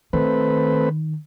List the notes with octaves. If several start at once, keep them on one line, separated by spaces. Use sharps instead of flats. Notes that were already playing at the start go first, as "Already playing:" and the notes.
D#3 A3 C4 B4